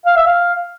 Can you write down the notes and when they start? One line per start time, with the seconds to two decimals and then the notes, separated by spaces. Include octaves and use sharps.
0.06 F5
0.16 E5
0.27 F5